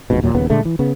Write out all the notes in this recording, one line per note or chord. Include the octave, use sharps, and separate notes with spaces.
A1 F2 G#2 B2
D#2 A#2 F#3
D#1 D#2 C#3 B3
A#2 D3 G#3 A3
E3
C#3 B3